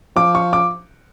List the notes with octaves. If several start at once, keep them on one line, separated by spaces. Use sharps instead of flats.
F3 D6
C#6
D6